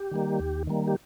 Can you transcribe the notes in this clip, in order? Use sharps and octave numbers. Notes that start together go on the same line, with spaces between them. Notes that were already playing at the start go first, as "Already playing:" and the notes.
Already playing: G4
D#3 G3 A#3
D#2
D#3 G3 A#3
G4